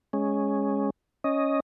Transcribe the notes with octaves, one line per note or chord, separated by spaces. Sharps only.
G#3 C#4
C#4 D#5